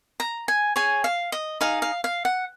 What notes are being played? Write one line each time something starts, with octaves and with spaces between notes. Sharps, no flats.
A#5
G#5
G#4 C#5 G#5
F5
D#5
D#4 G#4 D#5 F5
F5
F5
F#5